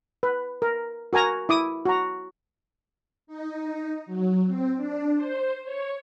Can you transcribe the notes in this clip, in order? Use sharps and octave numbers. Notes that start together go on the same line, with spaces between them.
B4
A#4
F#4 A#4 G#5 A#5
E4 D6 D#6
F#4 A#5
D#4
F#3
C4
D4
C5
C#5